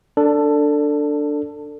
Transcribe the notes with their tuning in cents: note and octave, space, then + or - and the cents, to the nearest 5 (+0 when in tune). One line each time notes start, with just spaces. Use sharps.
D4 +0 A4 +20